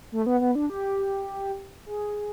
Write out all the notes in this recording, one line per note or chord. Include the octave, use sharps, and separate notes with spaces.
A3
B3
B3
D4
G4
G#4